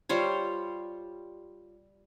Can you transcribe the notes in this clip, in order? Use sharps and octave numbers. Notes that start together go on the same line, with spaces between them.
G3 F4 C5 C#5